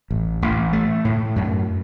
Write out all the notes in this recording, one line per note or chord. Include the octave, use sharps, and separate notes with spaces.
A1
A1
A3
A2
F#2